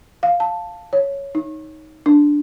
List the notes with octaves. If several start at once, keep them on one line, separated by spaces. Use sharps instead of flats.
F5
A5
C#5
D#4
D4